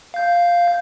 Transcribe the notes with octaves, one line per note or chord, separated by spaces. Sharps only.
F5 G6